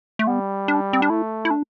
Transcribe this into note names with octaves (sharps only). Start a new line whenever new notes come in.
A3
G3 B3
D4
C4
D4
A3 E4
E4
D4